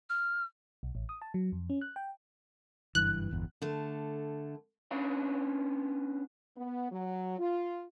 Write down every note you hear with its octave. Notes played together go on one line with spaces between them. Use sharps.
F6
B1
A1
D#6
A5
F#3
F2
C#4
F#6
G5
F#1 G2 E3 F#6
G1 E2
D3 A3
B3 C#4 D4 C#5 F5
B3
F#3
F4